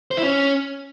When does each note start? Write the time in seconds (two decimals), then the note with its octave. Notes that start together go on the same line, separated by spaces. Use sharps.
0.11 C5
0.17 E4
0.23 C#4